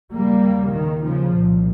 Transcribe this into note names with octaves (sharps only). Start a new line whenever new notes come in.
D#2 C#3 G3 A#3
D#3
C#3 F3
C2 A#2